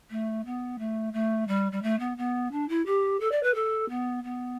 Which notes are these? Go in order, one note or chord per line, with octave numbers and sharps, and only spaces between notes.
A3
B3
A3
A3
G3
G3
A3
B3
B3
D4
E4
G4
A4
D5
B4
A4
B3
B3